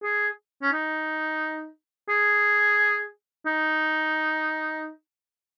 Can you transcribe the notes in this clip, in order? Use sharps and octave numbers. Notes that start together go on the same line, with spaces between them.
G#4
C#4
D#4
G#4
D#4